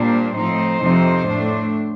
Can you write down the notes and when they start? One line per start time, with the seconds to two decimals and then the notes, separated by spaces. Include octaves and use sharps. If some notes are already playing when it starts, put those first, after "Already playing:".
Already playing: A#2 G3 A#3 D4 C5
0.36 A2 F3 C4 D#4 C5
0.81 F2 C3 F3 C4 D#4
1.26 A2 A3 D4